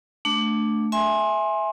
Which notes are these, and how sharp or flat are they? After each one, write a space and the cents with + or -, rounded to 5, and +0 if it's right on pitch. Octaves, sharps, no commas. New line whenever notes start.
A3 +0 D4 +0
E5 -5 G#5 +0 C6 +25